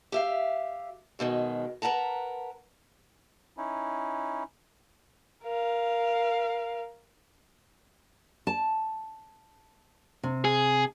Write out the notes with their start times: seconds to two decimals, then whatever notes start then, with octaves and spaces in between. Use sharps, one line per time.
0.12 G4 E5 F5
1.19 F#2 B2 D#3 G#3
1.82 A#4 B4 F#5 A5 A#5
3.57 C#4 D#4 E4
5.45 A#4 F5
8.47 A5
10.23 C3
10.45 G#4